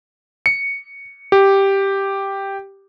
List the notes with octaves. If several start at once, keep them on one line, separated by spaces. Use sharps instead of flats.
C#7
G4